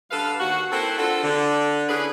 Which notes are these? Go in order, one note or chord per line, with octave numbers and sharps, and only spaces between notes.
D3 G3 A4 B4 F5
D#2 F#4
A#3 C4 E4 A4 B4 C5
C4 D4 F4 F#4 A4
D3
C#4 D4 E4 G#4 B4